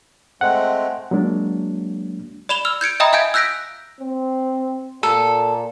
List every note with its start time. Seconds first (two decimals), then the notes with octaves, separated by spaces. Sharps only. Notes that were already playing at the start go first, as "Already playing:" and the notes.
0.41 G#3 A3 C4 F#5
1.11 F#3 G#3 A#3 D4 F#4
2.49 D5 B5 E7 F7 G7
2.65 E6 F6 F7
2.81 G6 G#6 C#7 D7
3.00 D#5 E5 G5 A#5 B5 D#6
3.13 E5 F5 G#5 G6 G#6 D7
3.34 E6 F#6 G6 A#6 B6 D7
4.01 C4
5.03 A#2 A4